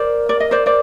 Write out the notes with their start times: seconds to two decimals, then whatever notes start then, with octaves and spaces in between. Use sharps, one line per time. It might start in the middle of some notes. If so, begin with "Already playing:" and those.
Already playing: A#4 C5 D5
0.29 D5
0.40 D#5
0.51 C5 D5
0.66 C5 D5